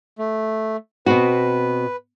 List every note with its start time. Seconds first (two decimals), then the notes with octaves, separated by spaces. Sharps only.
0.18 A3
1.06 B2 C4 F#4 B4